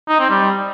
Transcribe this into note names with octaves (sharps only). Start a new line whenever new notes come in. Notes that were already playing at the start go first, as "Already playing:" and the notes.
D#4
C4
G3